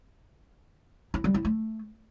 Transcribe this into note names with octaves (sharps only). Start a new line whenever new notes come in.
E4
G3
E4
A3